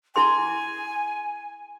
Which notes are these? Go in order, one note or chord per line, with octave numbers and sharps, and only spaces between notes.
E4 G#4 G#5 C6